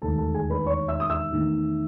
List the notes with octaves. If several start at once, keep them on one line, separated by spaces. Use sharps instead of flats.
E1 D#2 D#3 A3 A4 A5
A4 A5
G#4 G#5
B4 B5
C#5 C#6
E5 E6
D#6
E5 E6
E2 D#3 A3